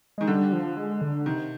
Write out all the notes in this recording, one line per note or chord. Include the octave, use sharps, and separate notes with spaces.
D#3 G#3
D3 G3
F3
G#3
D3
C3 D#3